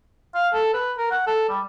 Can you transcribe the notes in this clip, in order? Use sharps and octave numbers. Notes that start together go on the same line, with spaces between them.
F5
A4
B4
A#4
F#5
A4
G3